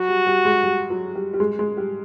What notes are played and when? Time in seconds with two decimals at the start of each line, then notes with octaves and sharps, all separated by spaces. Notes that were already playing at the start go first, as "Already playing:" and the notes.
Already playing: F#3 F#4
0.08 G3
0.27 G3
0.45 G#3
0.64 G3
0.90 F#3
1.15 G3
1.33 G3
1.40 G#3
1.59 G#3
1.77 G3